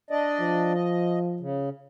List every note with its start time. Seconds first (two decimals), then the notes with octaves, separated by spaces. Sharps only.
0.11 D4 D5 D#5
0.40 F3
0.74 D#5
1.40 C#3